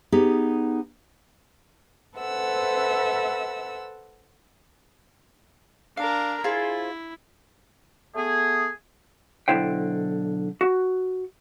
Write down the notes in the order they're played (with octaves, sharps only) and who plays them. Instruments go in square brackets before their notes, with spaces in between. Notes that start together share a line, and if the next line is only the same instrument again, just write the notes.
[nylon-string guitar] B3 D#4 G4 G#4
[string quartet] A4 B4 C5 E5 F#5 E6
[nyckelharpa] D4 A#4 [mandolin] F5
[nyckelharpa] E4 [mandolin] F4 G#4 C5
[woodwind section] A3 B3 G#4
[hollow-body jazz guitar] B1 D3 F#3 E4 C5 G5
F#4